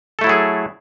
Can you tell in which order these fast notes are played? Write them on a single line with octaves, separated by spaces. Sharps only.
A4 A3 E4 F#3 G#4